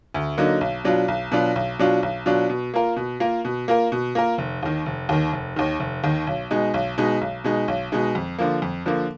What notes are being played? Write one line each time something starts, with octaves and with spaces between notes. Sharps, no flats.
D2
D3 F#3 A#3 D#4
B1
B2 F#3 D4 F4
B1
B2 F#3 D4 F4
B1
B2 F#3 D4 F4
B1
B2 F#3 D4 F4
B2
A#3 F4 A#4
B2
A#3 F4 A#4
B2
A#3 F4 A#4
B2
A#3 F4 A#4
F1
D#2 D#3
F1
D#2 D#3
F1
D#2 D#3
F1
D#2 D#3
B1
B2 G#3 D#4
B1
B2 G#3 D#4
B1
B2 G#3 D#4
B1
B2 G#3 D#4
F2
D3 F3 A#3
F2
D3 F3 A#3